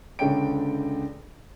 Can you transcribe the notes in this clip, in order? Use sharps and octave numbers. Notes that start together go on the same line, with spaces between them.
C#2 D3 C#4 C#5 G5 D7